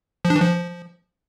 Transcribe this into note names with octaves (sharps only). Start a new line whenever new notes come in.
F3
D4
E3
F3